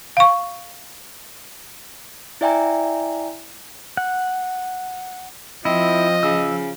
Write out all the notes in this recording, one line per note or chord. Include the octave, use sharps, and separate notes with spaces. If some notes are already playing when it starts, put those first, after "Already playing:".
F5 C#6
E4 D5 E5 G5 G#5 A#5
F#5
F3 C4 E4 D#5
C#3 E6